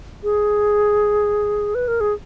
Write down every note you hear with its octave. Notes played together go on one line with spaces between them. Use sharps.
G#4
B4
A#4
G#4